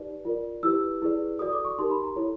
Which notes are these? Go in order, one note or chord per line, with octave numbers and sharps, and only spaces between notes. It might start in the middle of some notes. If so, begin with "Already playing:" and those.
Already playing: D#4 G4 B4 D5
F4 A#4 D5
E4 G4 B4 E6
E4 G#4 B4 D5
F#4 A4 D5 D#6
D6
C#6
D#4 G4 A#4 C6
B5
A#5
E4 A4 C#5